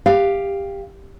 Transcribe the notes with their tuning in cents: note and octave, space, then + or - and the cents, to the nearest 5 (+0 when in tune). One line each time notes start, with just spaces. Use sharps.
G4 +15 F5 +0